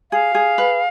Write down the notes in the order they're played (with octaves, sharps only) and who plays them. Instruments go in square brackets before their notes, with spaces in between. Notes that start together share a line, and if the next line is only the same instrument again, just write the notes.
[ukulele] G#4 [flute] F5
[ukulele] G#4
B4